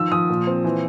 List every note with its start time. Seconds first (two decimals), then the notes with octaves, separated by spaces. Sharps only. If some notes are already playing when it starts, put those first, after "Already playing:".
Already playing: D#3 F3 E6
0.12 F3 D#6
0.29 A#2
0.47 C4
0.64 E3